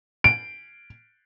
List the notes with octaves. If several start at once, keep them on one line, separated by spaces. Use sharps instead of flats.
D7